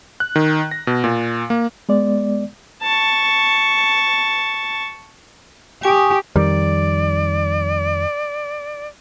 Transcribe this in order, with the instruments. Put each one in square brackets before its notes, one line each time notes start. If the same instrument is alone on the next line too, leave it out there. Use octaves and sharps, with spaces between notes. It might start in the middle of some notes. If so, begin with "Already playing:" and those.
[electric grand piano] F#6
D#3
A#6
B2
A#2
A#3
[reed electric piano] G#3 B3 D5
[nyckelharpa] A5 C#6
[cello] G4 [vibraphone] G#5 C#6 D#6
[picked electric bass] F2 D#3 G3 [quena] D5